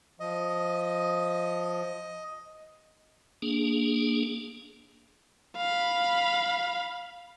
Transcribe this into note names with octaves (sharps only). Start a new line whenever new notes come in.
F3 D#5
A#3 D4 G#4
F5 B5